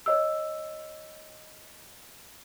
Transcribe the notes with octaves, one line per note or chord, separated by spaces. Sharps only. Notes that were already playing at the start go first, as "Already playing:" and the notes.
C#5 D#5 E6